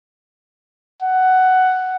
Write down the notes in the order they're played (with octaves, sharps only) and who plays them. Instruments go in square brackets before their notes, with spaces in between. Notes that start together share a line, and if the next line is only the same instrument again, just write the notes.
[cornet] F#5